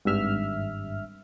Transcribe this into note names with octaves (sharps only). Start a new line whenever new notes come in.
G#1 G2 E5 F6